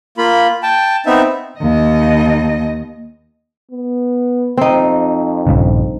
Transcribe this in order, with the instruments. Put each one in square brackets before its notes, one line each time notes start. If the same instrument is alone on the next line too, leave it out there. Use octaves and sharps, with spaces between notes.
[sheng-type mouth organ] A#3 F4 B5
G5 A5
B3 C4 D#4 E5
[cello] D#2 D#5
[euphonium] B3
[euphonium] F2 [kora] C4 D#4
[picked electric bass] A#1 G2 C#3